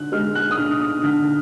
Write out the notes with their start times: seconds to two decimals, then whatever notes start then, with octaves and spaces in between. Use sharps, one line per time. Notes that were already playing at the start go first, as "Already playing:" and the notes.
Already playing: D3 F#6
0.12 G#3 F6
0.35 F#6
0.51 D#6
0.57 D4 F6
0.80 D#6
1.03 D3 F6